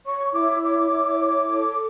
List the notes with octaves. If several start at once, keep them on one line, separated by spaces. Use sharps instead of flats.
C#5 C#6
E4 D6
C#5 D6
E4
C#5
A4